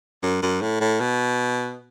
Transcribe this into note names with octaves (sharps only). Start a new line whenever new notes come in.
F#2
F#2
A2
A2
B2